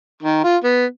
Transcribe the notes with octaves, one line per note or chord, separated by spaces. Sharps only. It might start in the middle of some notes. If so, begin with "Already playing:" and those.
D#3
F4
B3